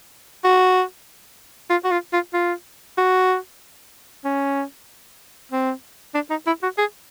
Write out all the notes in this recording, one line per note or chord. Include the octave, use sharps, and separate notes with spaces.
F#4
F4
F#4
F4
F4
F4
F#4
C#4
C4
D4
D#4
E4
F#4
G#4